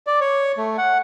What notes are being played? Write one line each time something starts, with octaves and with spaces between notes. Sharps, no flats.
D5
C#5
A3
F#5